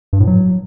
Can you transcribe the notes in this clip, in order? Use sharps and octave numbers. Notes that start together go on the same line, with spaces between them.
G2
A2
F#3